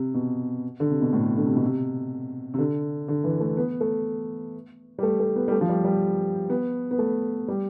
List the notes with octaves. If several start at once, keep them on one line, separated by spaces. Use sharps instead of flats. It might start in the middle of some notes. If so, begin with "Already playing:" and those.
Already playing: C3
B2
D3
C3
B2
A2
D3
C3
B2
C3
C3
D3
D3
E3
A3
B3
A3
G3
A3
A3
B3
G3
A3
F3
G3
G3
B3
B3
A3
G3